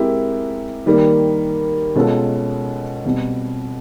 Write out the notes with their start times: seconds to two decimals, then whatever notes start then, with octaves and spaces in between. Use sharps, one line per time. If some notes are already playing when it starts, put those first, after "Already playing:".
Already playing: G#3 C4 E4 G4 A#4
0.86 D#3 G3 A#3
1.95 B2 G#3 C#4 F4 A4
3.05 B2 G3 C4